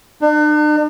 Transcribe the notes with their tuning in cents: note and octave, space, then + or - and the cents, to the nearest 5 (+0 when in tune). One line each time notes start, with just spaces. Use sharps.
D4 +45